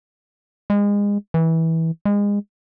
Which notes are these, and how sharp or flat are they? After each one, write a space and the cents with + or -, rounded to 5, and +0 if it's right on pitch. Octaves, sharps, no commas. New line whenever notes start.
G#3 -30
E3 -20
G#3 -30